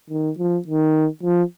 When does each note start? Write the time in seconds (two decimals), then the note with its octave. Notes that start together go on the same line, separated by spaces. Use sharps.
0.10 D#3
0.38 F3
0.67 D#3
1.23 F3